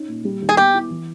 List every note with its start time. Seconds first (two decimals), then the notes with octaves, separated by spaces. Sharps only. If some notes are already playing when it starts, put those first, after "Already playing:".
Already playing: C#4 D#4
0.08 A#2
0.25 G3
0.42 D#2
0.49 G#4
0.57 B3 G4
0.74 E4
0.90 E3